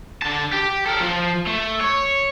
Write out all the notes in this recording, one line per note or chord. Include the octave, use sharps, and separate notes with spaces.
D3 A5
G4
A4 A#4
F3
A3
C#5